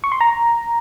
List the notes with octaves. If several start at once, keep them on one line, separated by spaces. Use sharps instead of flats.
C#6
C6
A#5